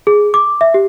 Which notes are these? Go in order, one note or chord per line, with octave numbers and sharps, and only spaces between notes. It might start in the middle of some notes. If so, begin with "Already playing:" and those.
G#4
D6
E5
G4